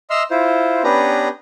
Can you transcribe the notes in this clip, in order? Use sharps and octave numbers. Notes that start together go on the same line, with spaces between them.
D#5 E5 C6 E6 F6
E4 F4 C5
B3 C#4 D4 G4 B4 A#5